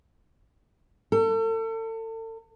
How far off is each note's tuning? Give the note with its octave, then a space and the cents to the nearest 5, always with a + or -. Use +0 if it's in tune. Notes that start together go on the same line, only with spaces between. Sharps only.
A4 +35